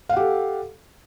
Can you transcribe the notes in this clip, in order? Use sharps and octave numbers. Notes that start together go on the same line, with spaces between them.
G4 A4 F5 F#5